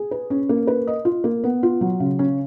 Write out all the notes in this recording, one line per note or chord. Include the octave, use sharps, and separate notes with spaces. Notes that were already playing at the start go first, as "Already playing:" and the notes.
Already playing: G#4
B4
C#4
A#3
B4
D#5
F4
A#3
B3
F4
F#3
C#3
C#4